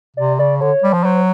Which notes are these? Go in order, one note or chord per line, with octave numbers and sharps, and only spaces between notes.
C3 D5
C#3 D5
D3 C#5
G3
F3
F#3 C5